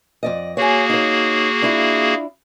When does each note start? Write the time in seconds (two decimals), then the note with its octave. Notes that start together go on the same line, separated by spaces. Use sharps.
0.23 F2 D5 D#5
0.57 A#3 F#4 G#4 C#5 G#5
0.90 D#4 C#5
1.62 D4 E4 F4